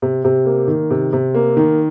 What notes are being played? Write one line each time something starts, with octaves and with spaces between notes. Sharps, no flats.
C3
C3
A#3
D#3
C3
C3
A#3
D#3